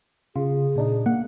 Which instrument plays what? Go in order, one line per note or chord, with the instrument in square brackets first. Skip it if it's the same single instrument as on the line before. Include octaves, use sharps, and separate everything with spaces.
[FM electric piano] C#3 F4 [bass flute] G#4
[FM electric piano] A#2 D4 D#4
[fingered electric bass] A#3 [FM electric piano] F#5